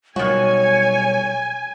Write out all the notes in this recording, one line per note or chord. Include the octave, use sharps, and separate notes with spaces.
B2 D#3 F#3 G3 F#4 C#5 G#5